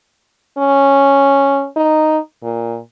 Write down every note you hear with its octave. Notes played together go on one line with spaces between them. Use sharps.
C#4
D#4
A#2